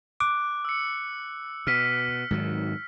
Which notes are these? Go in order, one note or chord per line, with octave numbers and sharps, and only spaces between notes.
D6 F#6
E6 C#7
B2 F6 B6
G#2 D#3 F#3